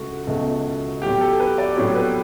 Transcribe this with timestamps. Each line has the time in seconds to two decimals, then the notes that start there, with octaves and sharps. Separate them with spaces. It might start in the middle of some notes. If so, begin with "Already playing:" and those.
Already playing: C#2 A3 F#4
0.27 C#2 B2 A3
1.02 A2 F#3 B3 G4
1.21 A4
1.39 B4
1.58 D5
1.76 A2 F#3 B3 C#5
1.95 B4